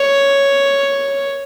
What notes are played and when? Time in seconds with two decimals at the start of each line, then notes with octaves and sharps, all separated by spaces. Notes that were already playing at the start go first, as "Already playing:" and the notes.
Already playing: C#5